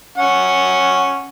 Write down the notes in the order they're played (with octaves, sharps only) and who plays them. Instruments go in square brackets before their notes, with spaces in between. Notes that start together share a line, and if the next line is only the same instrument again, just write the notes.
[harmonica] C#4 F#5